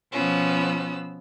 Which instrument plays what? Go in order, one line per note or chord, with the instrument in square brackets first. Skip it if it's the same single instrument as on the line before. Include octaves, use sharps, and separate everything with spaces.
[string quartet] B2 F3 B3 C#4 E6